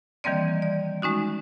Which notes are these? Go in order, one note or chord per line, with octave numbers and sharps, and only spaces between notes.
D#3 E3 G3 A#3 C4 D5
D5
G#3 C#4 D#4 F#4